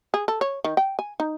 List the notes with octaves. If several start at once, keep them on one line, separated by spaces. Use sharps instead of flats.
G#4
A4
C#5
D#3
G5
G#5
D#4